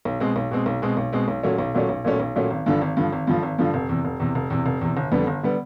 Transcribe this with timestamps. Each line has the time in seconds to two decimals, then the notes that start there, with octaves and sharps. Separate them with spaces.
0.05 B1
0.20 B2 G#3 C4
0.36 B1
0.51 B2 G#3 C4
0.66 B1
0.82 B2 G#3 C4
0.97 B1
1.13 B2 G#3 C4
1.28 B1
1.43 A#2 F#3 A3 C#4
1.58 B1
1.74 A#2 F#3 A3 C#4
1.89 B1
2.04 A#2 F#3 A3 C#4
2.20 B1
2.36 A#2 F#3 A3 C#4
2.50 G#1
2.66 G2 D3 F3
2.82 G#1
2.97 G2 D3 F3
3.13 G#1
3.27 G2 D3 F3
3.43 G#1
3.58 G2 D3 F3
3.74 F1
3.89 E2 C3
4.05 F1
4.20 E2 C3
4.35 F1
4.50 E2 C3
4.66 F1
4.81 E2 C3
4.97 G1
5.12 F2 D3 G3 B3
5.27 G1
5.43 D3 G3 B3